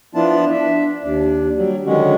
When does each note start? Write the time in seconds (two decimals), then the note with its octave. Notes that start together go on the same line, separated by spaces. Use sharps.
0.15 F3 B3 D4 E4 F4 A5
0.51 D4 E5
1.03 D#2 D4
1.56 F#3 G3
1.86 D3 D#3 F#3 G#3 C#4 F#4